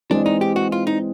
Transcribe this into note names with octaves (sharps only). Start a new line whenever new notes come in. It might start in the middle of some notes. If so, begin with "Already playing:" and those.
E3 G#3 C4 D4
D#4
G4
F#4
F4
D#4